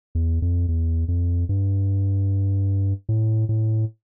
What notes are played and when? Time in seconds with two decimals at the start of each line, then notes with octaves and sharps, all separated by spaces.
0.15 E2
0.42 F2
0.68 E2
1.08 F2
1.49 G2
3.09 A2
3.49 A2